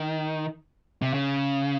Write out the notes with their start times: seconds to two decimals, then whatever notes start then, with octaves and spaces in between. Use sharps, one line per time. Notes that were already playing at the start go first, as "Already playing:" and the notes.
Already playing: D#3
1.02 C3
1.14 C#3